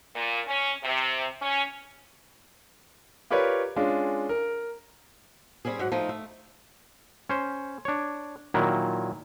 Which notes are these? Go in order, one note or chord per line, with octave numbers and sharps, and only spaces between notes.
A#2
C#4
C3
C#4
F4 G4 A#4 B4 C#5 D5
G#3 C#4 D4 F4
A#4
G3 C4 C#4 G#4
G#2 F#3 F#5
F3 A3 D#4
A3
C#4 C5
D4 C#5
A#2 D#3 F#3 E4